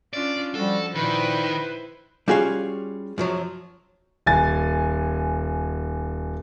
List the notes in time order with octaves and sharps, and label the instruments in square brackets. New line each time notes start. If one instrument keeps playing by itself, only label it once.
[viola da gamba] C#4 D4 F4 [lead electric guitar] D5
[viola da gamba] F3 F#4 [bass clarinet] G3 [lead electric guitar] A4
[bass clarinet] A#2 [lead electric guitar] D#3 [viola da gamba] E4 C5 [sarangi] B4
[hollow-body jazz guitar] G3 C#4 F5 [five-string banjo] F4 F#4 G#4
[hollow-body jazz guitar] F#2 F3 F#3
[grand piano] D#1 G#5 A6